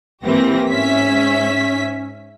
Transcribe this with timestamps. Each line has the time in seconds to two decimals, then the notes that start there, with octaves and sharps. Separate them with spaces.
0.24 G#1 E3 A#3 C4 G4 A#6
0.69 G#2 C#4 E5 B6